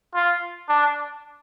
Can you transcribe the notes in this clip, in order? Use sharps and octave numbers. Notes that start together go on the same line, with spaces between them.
F4
D4